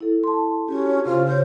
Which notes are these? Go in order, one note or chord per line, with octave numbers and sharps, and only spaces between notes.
E4 A4
A5 C6
C#4 F#4 G4
C#3 F4 C5
C#3 C5 C#5